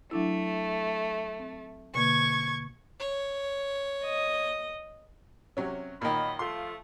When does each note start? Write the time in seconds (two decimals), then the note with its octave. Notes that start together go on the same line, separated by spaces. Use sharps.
0.11 F#3 A3 D4 E4
1.39 C4
1.95 B2 D3 A#3 C#6 G#6
2.99 C#5
4.05 D#5
5.57 C3 F#3 C#4
6.02 A#2 D#3 F#3 D#5 B5
6.39 F3 A3 F4 C6